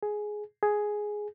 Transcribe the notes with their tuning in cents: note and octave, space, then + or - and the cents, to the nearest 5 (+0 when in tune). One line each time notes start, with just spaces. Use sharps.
G#4 +10
G#4 +5